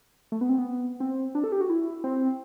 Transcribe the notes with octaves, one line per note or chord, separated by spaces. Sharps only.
A3
B3
C4
B3
C4
D4
A4
G4
F#4
E4
C4